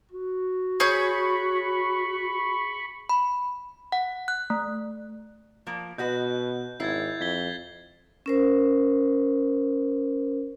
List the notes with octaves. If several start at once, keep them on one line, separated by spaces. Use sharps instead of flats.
F#4
G#4 C#5 B5 C#6 G6
B5
F#5
F#6
A3
F3 A#3
B2 F#4 B4 D#5 G6
G#1 E4 G#6 A6 C7
F2 G#6 B6 G7
C#4 A#4 C5